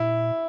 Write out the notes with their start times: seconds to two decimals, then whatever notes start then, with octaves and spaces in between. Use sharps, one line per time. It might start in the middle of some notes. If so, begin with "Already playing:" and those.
Already playing: A#2 E4